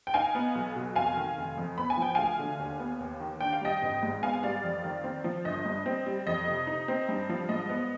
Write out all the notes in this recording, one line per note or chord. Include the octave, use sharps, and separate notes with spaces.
G5
D#4 F5 G#5
B3
B1
B2
F1 F5 G#5
D#3
F1
F2
B3 B5
G#5
F3 G5
D2 F5 G#5
D3
D#2
B3
D#2
D#3
D4 G5
F5
G3 D#5 G5
G#1
G#2
B3 F5 G#5
G3 D5 F5
F2
D#3
C4
F3
G1 D#5
G2
C4
G3
F2 D#5
C3
D#4
C4
G2
F3
G#2 D#5
B3